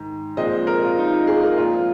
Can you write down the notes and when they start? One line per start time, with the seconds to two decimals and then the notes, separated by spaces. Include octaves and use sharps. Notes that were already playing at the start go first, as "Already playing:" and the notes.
Already playing: G#2 D#3
0.37 A#2 F3 G#3 C4 D#5
0.67 A#4
0.82 F4
0.98 D#4
1.12 F4
1.27 G#4
1.43 A#4
1.58 A#2 F3 G#3 C4 F4